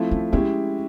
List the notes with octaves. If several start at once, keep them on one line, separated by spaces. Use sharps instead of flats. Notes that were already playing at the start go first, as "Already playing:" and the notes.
Already playing: F3 A3 C4 E4
C#4
G#3 B3 C#4 E4 G4